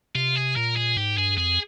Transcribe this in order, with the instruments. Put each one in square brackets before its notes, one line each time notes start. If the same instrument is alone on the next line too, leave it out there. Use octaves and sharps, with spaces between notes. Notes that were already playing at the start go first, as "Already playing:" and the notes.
[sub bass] C3 [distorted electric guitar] F4
[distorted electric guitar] G#4
[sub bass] A#2 [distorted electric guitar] A#4
[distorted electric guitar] G#4
[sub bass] G#2 [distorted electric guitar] G4
[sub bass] G2 [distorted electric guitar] G#4
[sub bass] F2 [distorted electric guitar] G#4